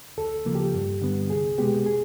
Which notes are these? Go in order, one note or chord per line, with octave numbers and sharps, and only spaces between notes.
D2 A4
C#3 F3 A#3
G4
G2
D3 G3 B3
C2 G#4
B2 G#3 B3 G4
G#4